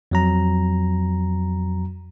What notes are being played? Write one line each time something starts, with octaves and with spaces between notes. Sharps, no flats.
F2 F#3 A#5